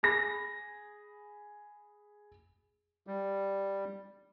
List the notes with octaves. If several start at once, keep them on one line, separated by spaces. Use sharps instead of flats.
G#4 B5 A#6
G3